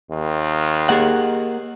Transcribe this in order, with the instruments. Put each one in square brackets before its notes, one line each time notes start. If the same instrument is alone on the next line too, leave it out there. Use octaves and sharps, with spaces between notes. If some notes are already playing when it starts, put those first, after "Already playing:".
[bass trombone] D#2
[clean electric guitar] A#3 F#5 [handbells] G4 G#4 D#5